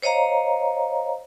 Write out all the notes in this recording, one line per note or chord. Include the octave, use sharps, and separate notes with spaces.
C5 C#5 D#5 F5 A#5